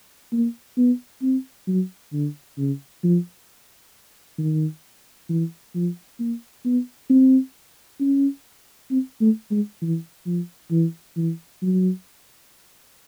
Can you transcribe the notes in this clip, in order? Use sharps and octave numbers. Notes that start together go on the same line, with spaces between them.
A#3
B3
C4
F#3
D3
C#3
F3
D#3
E3
F3
A#3
B3
C4
C#4
C4
A3
G#3
E3
F3
E3
E3
F#3